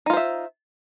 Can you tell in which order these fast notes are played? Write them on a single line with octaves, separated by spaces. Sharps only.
D#4 F4 C5 E5